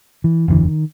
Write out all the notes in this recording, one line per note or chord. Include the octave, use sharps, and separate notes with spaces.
E3
F#1 E2 D3 E3
D#3